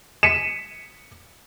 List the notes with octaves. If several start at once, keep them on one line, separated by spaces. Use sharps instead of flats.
B6 C#7 D#7 E7